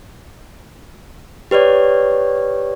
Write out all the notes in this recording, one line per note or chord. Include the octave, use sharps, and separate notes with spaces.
G4 B4 C#5 D5